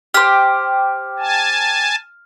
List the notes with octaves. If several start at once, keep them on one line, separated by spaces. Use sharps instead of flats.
G4 C5 F6
G#5 A5